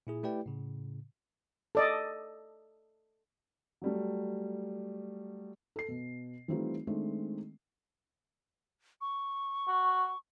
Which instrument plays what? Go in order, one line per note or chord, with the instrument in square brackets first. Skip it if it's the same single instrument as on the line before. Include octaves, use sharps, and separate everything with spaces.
[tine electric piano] A#2 E4 G#4
A3 E4 G4 B4 D5 G5
A2 C#3
[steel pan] A4 D5 D#5
[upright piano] F#3 G3 A3
[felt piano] A4 C7
B2
E3 G3 A3 C4 D#4 F4
D#3 G#3 A3 C4 D4
[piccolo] C#6
[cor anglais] F#4